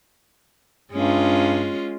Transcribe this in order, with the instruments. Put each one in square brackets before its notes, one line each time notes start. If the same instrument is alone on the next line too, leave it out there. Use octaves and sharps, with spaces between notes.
[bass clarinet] G2 [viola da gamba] G#3 C#4 F4